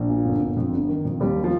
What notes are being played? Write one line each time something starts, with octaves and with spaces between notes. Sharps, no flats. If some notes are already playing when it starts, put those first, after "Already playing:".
Already playing: A#1
A#2
G1
G1
F2
G1
D#3
F2
D#2 G3
D#3
F3